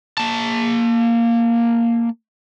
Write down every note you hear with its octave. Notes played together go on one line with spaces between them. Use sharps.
A#3 A5